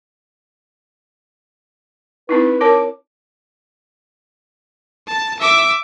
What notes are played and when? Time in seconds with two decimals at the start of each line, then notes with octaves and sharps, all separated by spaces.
2.29 C4 D#4 E4 B4
2.61 A#4 C#5 A5 D6
5.08 A5
5.39 E5 D6